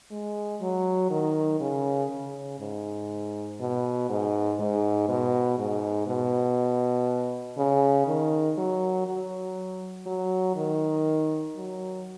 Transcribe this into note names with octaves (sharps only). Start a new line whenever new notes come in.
G#3
F#3
D#3
C#3
C#3
G#2
B2
G#2
G#2
B2
G#2
B2
C#3
D#3
F#3
F#3
F#3
D#3
F#3